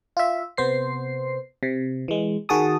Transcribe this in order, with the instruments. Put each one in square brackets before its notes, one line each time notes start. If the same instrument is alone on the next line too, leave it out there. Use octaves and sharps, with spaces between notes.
[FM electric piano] F4 E5
C3 B3 C5 C7
C3
E3 G#3
D#3 F#4 G#4 A5 D#6